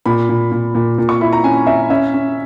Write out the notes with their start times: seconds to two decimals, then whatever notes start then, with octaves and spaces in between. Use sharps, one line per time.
0.06 A#2 B5
0.29 A#2
0.52 A#2
0.75 A#2
0.98 A#2
1.09 C#6
1.21 E4 B5
1.33 A#5
1.44 C#4 G#5
1.67 C#4 E5
1.90 C#4 E5
2.14 C#4